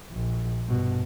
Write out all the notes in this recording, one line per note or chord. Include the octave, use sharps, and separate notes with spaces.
A#1
G2 B2